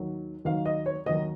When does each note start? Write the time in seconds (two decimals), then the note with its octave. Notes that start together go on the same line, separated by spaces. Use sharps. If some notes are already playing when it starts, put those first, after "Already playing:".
Already playing: D#2 D#3 F#3
0.45 D#2 D#3 F#3 F5
0.66 D#5
0.86 C#5
1.06 D#2 D#3 F#3 D#5